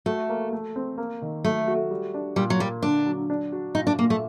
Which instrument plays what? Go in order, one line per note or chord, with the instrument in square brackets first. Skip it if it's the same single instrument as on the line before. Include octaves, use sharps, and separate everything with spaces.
[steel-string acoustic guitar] A3 [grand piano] F#4
[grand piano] A#3
A3
C4
A#3
D#3
[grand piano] F#3 [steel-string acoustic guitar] A3
[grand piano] F#4
G3
D4
[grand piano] A#2 [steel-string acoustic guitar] G3
[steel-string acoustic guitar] F#3
[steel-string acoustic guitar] G3 [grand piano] A#3
[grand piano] D3 [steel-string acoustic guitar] D4
[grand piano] F#3
D4
F#4
[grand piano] A#2 [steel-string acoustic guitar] D#4
[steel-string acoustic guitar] D4
[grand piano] A#2 [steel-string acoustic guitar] A#3
[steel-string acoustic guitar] A3